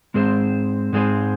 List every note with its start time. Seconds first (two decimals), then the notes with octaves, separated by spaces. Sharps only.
0.14 G#2 G#3 C4 G#4 C5
0.93 G#2 G#3 C4 G#4 C5